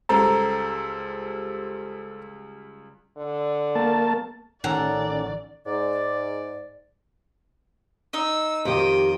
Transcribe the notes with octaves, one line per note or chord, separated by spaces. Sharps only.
C#2 G3 A4 C5 A#5
D3
A#3 A5
A1 D#3 C#4 A4 A#4 D5 F#5
G#2 D5
D#4 D#5 E6
F2 D#3 G4 G5 D#6